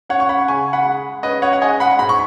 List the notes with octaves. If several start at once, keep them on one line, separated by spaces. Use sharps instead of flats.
C#4 C#5 F#5
C#6
F#5 B5
C#3 G#5 C#6
F#5 B5
G#3
C#4 B4 D#5
C#5 F#5
F#5
G#3 D#5 G#5
F#5 B5
G#2 B5
C#6